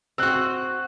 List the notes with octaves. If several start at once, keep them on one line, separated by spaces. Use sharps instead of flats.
C4 F#4 E6 F#6